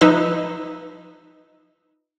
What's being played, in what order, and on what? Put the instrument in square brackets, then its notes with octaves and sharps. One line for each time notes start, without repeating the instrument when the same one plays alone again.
[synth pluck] F3 D#4 B4 E5 E6